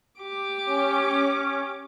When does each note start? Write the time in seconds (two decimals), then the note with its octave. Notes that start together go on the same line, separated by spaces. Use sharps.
0.20 G4 D6
0.66 C#4